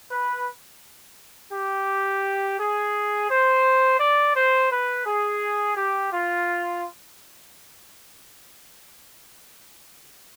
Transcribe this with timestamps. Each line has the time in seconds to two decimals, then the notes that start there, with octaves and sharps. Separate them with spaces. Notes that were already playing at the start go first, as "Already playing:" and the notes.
0.12 B4
1.53 G4
2.59 G#4
3.30 C5
4.00 D5
4.35 C5
4.71 B4
5.06 G#4
5.77 G4
6.12 F4